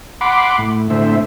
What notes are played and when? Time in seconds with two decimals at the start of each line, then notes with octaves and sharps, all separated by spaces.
0.21 F#5 B5 C6 D6
0.58 A2
0.90 A2 D3 C5 E5